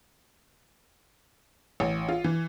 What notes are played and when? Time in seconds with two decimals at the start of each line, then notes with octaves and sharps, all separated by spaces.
1.80 A1
2.09 F4
2.24 E3